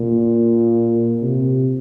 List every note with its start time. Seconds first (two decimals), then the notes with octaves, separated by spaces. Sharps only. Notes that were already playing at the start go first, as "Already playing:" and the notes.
Already playing: A#2
1.22 C3